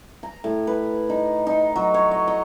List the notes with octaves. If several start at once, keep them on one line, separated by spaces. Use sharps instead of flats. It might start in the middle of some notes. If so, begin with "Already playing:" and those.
A#5
A2
B4
D#4
D#4
F#3
C#5
D#5
D#5